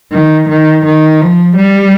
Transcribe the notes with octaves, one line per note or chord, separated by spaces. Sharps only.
D#3
D#3
D#3
F3
G3